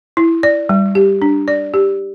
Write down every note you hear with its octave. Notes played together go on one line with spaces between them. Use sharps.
E4
D5
G3
G4
D4
D5
G4